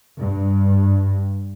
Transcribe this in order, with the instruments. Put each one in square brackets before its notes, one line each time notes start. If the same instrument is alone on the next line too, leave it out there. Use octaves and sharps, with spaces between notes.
[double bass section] G2